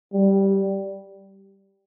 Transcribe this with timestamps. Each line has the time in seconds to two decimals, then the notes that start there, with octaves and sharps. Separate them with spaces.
0.13 G3